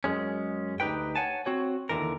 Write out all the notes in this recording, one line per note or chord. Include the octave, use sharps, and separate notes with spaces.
F#2 G#3 C#4
D2 D#4 G4 B4 G5
C#5 F#5 G#5 A5
C4 F#4 C#5
D#2 A#2 D3 E3 A#4